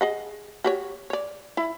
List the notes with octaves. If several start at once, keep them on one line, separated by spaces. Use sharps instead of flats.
G#4 D#5 F#5
F#4 G4 C#5
C#5 D5
E4